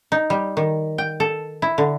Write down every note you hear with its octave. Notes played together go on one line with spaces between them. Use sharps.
D#4
G3
D#3
G5
A4
E4
D3